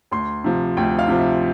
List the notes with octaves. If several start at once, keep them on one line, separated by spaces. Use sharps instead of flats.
D2 C6
C3 F3
D2 G5
F5
C3 F3
E5